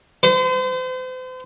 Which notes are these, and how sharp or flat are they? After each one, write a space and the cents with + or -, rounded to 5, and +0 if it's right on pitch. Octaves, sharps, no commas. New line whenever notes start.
C5 -40